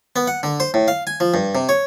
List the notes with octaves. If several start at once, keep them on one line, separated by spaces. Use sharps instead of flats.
B3
F#5
D3
C5
A2
F5
G#5
F3
G2
C3
C#5